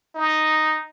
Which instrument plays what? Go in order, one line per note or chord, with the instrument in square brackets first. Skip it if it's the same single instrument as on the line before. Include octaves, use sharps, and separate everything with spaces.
[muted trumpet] D#4